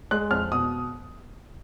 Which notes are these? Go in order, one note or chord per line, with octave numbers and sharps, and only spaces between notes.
G#3 F#6
F2 F6
B2 D#6